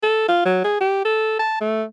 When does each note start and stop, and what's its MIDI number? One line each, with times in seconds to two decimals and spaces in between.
0.03 0.27 69
0.28 0.43 65
0.45 0.60 54
0.64 0.78 68
0.81 1.05 67
1.05 1.36 69
1.39 1.59 81
1.61 1.83 57